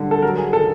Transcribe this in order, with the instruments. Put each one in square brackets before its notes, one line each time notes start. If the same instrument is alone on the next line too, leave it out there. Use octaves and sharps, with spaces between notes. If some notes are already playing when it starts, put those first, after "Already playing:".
Already playing: [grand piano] D3 G3
A4
F#3 A#4
G#4
D#3 A4